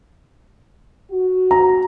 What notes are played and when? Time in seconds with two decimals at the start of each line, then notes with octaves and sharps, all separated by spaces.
1.11 F#4
1.51 A#5